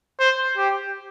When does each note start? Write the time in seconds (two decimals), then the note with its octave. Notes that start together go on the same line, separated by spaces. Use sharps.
0.19 C5
0.57 G4